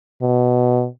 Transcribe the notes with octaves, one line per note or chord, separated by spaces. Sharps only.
B2